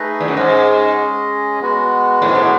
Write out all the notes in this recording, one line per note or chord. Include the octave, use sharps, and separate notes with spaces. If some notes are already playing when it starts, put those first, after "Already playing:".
Already playing: A3 D#4 G#4 B4 D#5
E2
F#2
G#2 G#3 C#4 G#4 D#5
G#3 B3 F#4
A2
G#2
A2